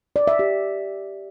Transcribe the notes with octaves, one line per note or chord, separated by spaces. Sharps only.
D5
E5
G4